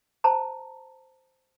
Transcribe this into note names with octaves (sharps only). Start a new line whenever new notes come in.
C5 A5 A#5